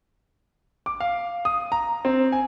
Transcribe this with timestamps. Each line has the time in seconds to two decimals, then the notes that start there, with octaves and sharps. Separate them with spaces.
0.86 D6
1.00 F5
1.45 D#6
1.72 A#5
2.05 C4
2.32 G#5